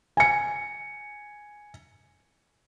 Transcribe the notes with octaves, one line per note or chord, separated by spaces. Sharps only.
G#5 C#7